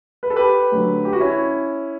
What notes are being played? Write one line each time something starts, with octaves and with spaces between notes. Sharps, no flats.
B4
A4
G4 B4
D3 F#3 A3
G4
F#4
C#4 E4